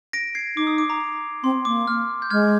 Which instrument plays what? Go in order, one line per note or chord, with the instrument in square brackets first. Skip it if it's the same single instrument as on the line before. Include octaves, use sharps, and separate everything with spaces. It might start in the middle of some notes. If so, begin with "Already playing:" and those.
[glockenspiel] A#6 D7
G#6 C7
[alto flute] D#4 [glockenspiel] D6
[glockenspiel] D#6
D6
A#5
[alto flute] C4 [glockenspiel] C6
[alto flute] A#3 [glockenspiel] D6
[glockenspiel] F6
G6
[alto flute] G#3 [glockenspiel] F6 G#6